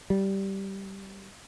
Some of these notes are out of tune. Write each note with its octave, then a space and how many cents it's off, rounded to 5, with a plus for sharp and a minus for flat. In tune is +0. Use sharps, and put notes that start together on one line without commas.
G3 -10